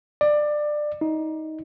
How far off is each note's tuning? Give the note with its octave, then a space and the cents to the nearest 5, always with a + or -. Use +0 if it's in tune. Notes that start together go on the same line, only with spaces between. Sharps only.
D5 +20
D#4 +15